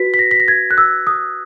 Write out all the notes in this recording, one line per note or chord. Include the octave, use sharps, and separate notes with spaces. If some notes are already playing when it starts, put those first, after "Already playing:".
Already playing: F#4 B4 B6
B6
A#6
B6
A#6
G#6
F#6
E6
D#6